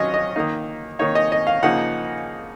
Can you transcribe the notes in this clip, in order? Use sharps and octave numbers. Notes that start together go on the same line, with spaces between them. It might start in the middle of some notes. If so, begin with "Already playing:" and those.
Already playing: D#3 F#3 C#4 F4 C#5 D#5
D#5
D#3 A#3 D#4
D#3 A#3 D#4 C#5
D#5
D#5
F5
C#3 F3 A#3 D#4 F#5